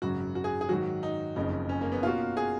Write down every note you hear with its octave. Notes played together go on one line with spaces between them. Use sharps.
G#1 F#2 C#3 F#3 F#4
F#4
G#4
G#4
G#2 D#3 F#3 F#4
D#4
F#1 F2 C#3 D#4
C#4
A#3
B3
B2 A#3 C#4 F4 F#4
G#4